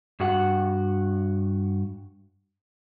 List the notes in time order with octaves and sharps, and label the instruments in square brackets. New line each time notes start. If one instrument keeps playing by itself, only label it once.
[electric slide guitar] G2 F#4 F#5